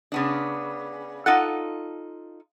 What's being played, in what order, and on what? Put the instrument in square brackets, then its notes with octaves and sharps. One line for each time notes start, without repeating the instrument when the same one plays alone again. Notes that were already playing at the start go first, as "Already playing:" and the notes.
[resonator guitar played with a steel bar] C#3 B3 D4
[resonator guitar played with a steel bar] D#4 F4 A4 [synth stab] F#5